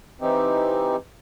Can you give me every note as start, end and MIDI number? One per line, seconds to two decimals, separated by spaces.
0.21 0.96 52
0.21 0.96 60
0.21 0.96 63
0.21 0.96 67